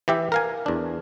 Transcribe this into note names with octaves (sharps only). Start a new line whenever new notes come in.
E3 G4 E5
A#4 F5 G#5
E2 D4